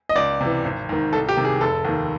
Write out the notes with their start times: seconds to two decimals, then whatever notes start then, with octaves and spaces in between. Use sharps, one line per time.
0.09 D#5
0.16 C#2 D5
0.40 C3 E3
0.65 G#1
0.89 G#2 D#3
1.13 C2 A4
1.29 G4
1.37 C3 D#3
1.45 G#4
1.60 F1 A4
1.85 D#2 D#3